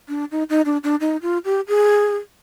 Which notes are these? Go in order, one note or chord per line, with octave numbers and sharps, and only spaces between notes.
D4
D#4
D#4
D4
D4
D#4
F4
G4
G#4